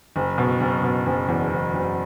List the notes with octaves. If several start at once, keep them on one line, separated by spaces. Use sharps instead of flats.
F#1
B2
F#1
B2
F#1
E2
F#1
F#1